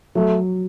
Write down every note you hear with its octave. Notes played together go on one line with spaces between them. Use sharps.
F#3 A3